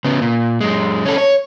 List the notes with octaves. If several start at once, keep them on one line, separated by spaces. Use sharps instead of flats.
C#3 B3
A#2
F#2 G#3
C#4 A4
C#5